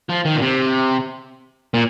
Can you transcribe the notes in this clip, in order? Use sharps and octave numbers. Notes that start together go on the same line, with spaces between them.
F3
D#3
A#2
C3
A#2